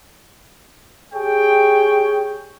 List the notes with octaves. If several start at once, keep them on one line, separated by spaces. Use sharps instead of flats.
G4 G#4 C#5 G5